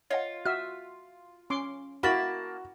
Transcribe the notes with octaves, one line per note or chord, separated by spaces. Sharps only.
F4 C#5 D#5 F#5
F#4 E5 F6
C#4 C6 D6
A#3 E4 F#4 A5 B5